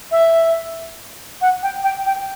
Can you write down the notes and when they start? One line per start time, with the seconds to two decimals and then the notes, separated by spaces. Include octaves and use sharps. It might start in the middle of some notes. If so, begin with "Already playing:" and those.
0.11 E5
1.41 F#5
1.63 G5
1.84 G5
2.06 G5